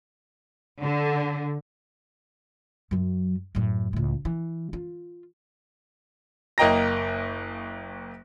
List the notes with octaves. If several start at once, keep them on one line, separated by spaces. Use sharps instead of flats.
D3
F#2 F#3
F#2 A2
C#2 A2
E3
F4
F#1 A#3 D#5 G5 A#5 A#6